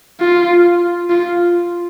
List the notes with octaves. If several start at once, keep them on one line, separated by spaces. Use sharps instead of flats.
F4
F4